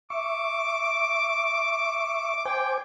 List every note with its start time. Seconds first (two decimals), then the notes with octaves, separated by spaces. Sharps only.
0.10 E5 C#6 D6
2.45 C5 G5 G#5 D6